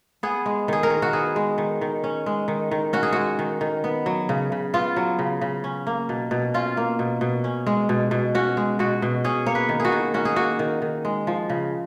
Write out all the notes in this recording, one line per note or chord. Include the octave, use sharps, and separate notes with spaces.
B3 G#4
G#3
D#3 G#4
A#4
D#3
F#4
B3 G#4
G#3
D#3
D#3
C#4
G#3
D#3
D#3
C#4 F#4
G#4
G#3 F#4
D#3
D#3
B3
F#3
C#3
C#3
B3 F4
F#3
C#3
C#3
C#4
A#3
B2
B2
C#4 F4
A#3
B2
B2
C#4
G#3
B2
B2
C#4 F#4
G#3
B2 F#4
B2
C#4 G#4
A#3 C#5
B4
D#3
G#4
F#4
D#3
C#4 F#4
G#4
A#3 F#4
D#3
D#3
G#3
F3
C#3